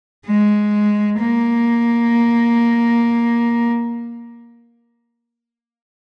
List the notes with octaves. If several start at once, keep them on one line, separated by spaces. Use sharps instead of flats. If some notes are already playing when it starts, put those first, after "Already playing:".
G#3
A#3